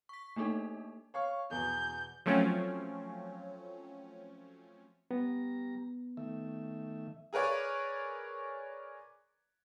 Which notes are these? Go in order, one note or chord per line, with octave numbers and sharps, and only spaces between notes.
C#6 B6
A3 A#3 D4 D#4 A4
C#5 F5 C#6
E2 B2 G6
F3 F#3 A3 C4 C#4
G3 B3 A#5
D#3 A3 E5
G#4 A#4 B4 C#5 D5